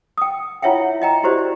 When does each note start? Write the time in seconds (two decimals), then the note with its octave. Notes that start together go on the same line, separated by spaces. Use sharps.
0.18 G5 D#6
0.62 E4 F4 C#5 E5 F#5 G5
1.02 D#5 G5 A#5
1.23 E4 F#4 G4 C5 D5